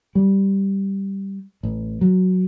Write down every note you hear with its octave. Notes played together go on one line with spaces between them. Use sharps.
G3
A1
F#3